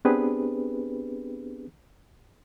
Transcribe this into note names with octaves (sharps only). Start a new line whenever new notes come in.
B3 C4 D4 G4 G#4 B4